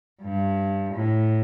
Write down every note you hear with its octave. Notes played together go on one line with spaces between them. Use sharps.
G2
A2